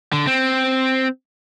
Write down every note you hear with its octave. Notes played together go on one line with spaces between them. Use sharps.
D3
C4